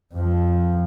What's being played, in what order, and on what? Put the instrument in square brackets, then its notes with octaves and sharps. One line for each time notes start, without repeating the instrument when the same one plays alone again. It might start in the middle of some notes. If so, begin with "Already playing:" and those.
[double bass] F2 F3